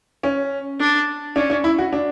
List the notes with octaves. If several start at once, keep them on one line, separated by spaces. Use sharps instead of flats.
C#4
D4
C#4 D4
D4
E4
F#4
D4